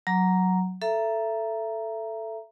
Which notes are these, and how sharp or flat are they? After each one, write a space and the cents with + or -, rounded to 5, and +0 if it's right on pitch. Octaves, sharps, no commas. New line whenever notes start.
F#3 +0 A#5 +0
A4 +0 E5 +25 A#5 +0